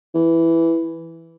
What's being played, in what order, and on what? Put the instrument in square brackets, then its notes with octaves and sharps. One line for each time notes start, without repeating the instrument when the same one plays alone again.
[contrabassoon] E3